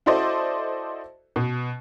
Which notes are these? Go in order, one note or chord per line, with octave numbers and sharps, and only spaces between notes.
E4 F#4 A4 C5 D5 D#5
B2